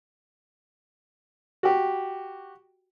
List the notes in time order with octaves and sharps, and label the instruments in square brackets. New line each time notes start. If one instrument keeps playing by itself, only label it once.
[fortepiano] F#4 G4